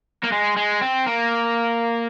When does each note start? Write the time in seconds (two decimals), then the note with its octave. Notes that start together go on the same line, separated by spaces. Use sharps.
0.24 A#3
0.32 G#3
0.56 G#3
0.81 C4
1.06 A#3